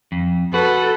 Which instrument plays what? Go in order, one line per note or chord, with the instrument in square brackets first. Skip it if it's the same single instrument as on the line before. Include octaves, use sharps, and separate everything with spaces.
[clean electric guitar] F2
[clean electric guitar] F#4 [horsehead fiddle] A4 [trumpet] B4